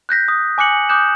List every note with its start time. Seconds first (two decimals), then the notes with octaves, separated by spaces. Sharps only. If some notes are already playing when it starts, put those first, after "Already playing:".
0.09 F#6 G6 A#6 B6
0.28 D#6
0.58 G#5 D6 F#6 C#7 F#7
0.89 D6 D#6 F#6 G6 E7